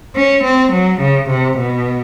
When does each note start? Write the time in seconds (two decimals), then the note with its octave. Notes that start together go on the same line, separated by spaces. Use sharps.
0.16 C#4
0.44 C4
0.73 F#3
1.01 C#3
1.30 C3
1.58 B2